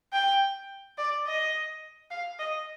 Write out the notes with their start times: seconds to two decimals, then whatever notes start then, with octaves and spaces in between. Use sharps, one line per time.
0.13 G5
0.98 D5
1.26 D#5
2.11 F5
2.39 D#5